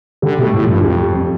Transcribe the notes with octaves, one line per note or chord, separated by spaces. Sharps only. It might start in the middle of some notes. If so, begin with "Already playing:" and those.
D3 G3
B2 A3
A2
F3
G2
F2 G3
C4